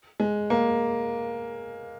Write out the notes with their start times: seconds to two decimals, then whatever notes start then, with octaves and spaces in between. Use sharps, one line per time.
0.20 G#3
0.50 A#3